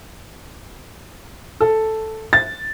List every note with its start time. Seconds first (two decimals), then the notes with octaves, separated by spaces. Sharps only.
1.60 A4
2.33 A6